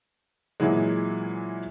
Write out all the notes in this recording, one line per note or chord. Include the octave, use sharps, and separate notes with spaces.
A#2 E3 F#3 G#3